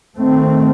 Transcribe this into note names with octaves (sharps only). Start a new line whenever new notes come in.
D#3 A3 C4